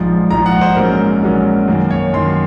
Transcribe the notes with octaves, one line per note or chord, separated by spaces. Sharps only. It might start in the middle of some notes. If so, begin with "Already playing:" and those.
Already playing: A#1 G#2 F3
A#1 G#2 F3 A#5
F#5
C5
A#1 G#2 F#3 A#3 C#4 A#4
A#1 G#2 F#3 A#3 C#4
F#2 D#3 A#3
C#5
F#2 D#3 A#3 C6